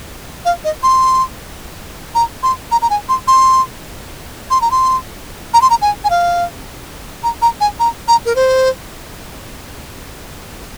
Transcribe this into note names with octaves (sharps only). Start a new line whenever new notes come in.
F5
D#5
C6
A#5
C6
A#5
A#5
G#5
C6
C6
C6
A#5
C6
A#5
C6
A#5
G#5
G#5
F5
A#5
A#5
G#5
A#5
A#5
A#4
C5